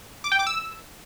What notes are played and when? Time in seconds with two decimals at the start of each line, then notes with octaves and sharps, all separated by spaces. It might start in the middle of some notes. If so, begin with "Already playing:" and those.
0.24 D6
0.32 G5
0.39 D6
0.47 E6